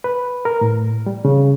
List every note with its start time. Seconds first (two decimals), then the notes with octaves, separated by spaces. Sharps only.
0.04 B4
0.45 A#4
0.61 A2
1.06 G3
1.25 C#3